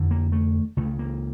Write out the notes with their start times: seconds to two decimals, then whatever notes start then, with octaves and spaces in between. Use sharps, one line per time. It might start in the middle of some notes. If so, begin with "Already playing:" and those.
Already playing: F2 D3
0.11 A#3
0.32 A3
0.77 C#2 C#3 A3
0.99 A#3